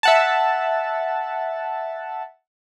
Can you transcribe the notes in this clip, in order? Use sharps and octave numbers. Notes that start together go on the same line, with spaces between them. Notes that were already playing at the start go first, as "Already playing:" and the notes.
E5 F#5 A5